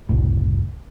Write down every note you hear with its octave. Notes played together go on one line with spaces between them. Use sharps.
F#1 C2 A2